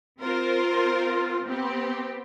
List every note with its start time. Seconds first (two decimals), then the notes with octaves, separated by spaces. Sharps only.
0.22 C4 F4 A#4 C5
1.45 B3 C4 G4